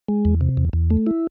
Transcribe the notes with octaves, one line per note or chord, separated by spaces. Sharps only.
G#3
E2
C3
E2
E2
A3
E4